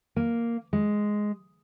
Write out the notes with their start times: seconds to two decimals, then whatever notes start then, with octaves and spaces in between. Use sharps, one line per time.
0.16 A#3
0.73 G#3